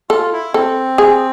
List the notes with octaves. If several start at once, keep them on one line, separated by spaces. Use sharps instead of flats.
F4 A4
E4
C4 A4
G#4